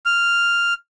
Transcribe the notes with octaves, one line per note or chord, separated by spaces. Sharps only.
F6